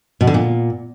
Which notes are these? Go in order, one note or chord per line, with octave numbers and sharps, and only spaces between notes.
B2
D3
A#2